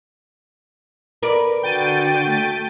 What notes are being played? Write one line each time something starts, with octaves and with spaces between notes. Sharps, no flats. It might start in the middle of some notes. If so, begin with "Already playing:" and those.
A#4 B4 D5
D3 F#4 G5 A6 D#7
A3